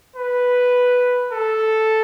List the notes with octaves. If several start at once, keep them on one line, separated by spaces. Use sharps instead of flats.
B4
A4